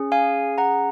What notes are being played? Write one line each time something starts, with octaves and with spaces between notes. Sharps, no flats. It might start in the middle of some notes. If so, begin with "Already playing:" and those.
Already playing: C#4 G#4
F5 G#5
F#5 A#5